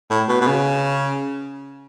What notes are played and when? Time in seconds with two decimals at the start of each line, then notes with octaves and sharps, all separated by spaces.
0.10 A2
0.28 B2
0.41 B2
0.47 C#3